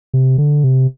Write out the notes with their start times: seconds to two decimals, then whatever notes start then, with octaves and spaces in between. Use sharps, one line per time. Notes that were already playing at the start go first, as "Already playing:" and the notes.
0.14 C3
0.38 D3
0.64 C3